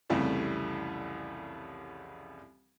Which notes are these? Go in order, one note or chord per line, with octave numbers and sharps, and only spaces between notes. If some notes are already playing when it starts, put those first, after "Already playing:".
C2 F2 C#3 E3 G3 A3